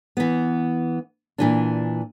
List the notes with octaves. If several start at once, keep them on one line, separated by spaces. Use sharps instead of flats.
E3 B3
A#2 E3 D4